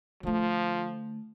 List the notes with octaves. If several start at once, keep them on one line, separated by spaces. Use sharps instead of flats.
D3 F3 A3